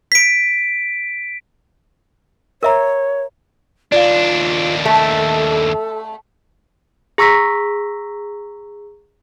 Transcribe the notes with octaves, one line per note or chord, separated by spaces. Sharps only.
B6 D7
A#4 C#5 E5 A#5
D#2 D4 F4 D5 F5
A3 A4
G#4 A#5 C#6 E6 A#6 B6